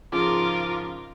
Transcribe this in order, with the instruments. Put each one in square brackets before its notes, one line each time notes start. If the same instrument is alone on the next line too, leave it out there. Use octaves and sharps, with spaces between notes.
[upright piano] G#2 C#3 F3 [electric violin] F4 A#4 [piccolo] D6